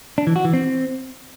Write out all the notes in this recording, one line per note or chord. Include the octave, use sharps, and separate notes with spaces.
D4
E3
F#4
E3
C4